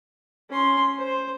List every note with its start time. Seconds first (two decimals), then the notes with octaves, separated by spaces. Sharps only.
0.50 C#4 C6
0.98 C5